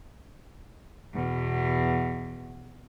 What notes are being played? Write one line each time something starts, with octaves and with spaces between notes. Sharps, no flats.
E2 B2